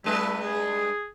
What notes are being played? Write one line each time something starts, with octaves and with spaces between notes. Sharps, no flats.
G2 G3 G#3 E4 B4
G#4